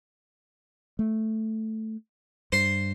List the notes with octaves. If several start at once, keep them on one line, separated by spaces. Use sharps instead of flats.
A3
G2 C5 C6